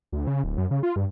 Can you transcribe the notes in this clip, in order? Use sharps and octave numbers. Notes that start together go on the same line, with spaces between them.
D2
C#3
D1
F#2
C#3
F4
G2